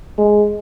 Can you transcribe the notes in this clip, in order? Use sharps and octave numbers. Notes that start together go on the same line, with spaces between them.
G#3